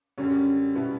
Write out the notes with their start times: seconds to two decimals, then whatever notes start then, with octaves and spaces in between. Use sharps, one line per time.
0.18 F#2 D3 G3 C#4
0.75 B2 G3 B3 E4